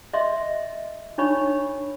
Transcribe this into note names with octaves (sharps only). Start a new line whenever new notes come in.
D#5 E5 C6
D4 D#4 C#5 B5 C#6